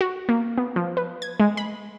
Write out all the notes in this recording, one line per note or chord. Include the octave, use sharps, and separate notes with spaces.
F#4
A#3
B3
F3
B4
G#6
G#3
B5